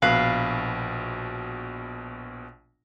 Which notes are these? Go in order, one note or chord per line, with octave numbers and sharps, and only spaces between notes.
A#1 B2 B4 F5